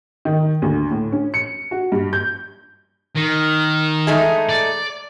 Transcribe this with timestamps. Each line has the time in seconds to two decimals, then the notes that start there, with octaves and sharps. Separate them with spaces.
0.25 D#3
0.62 D2
0.91 A2
1.12 C#4
1.34 C#7
1.71 F#4
1.92 G2
2.13 G6
3.16 D#3
4.07 G#3 A3 D#4
4.49 D5